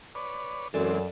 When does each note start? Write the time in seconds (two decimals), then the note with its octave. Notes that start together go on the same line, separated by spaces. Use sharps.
0.15 B4 C#5 D5
0.74 F#2 E3 G#3 C4 A4 D5